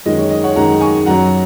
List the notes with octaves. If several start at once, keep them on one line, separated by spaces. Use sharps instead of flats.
F#2 D#3 G#3 D#5
C#5
D#5
C#5 F#5
F#2 D#3 G#3 F#5 A#5
G#5 C#6
F#2 F#3 F#5 A#5